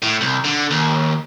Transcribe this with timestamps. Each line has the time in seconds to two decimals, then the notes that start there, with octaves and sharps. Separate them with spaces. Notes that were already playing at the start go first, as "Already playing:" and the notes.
0.02 A2
0.21 C2
0.44 D3
0.71 D#2